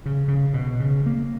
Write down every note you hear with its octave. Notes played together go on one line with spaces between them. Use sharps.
C#3
C#3
B2
C#3
A#3